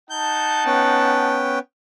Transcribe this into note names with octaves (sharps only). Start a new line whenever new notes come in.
D#4 F#5 A5 G6
B3 C#4 G5